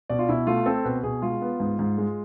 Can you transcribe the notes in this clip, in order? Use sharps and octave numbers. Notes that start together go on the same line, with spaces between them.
B2 D5
F4
B2 E4
A3 F4
C4 A4
B2 B4
B2 G#4
G#3 F4
B3
G#2
G#2
G#3